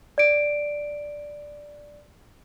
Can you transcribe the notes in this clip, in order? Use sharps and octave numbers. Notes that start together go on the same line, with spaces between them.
D5 D7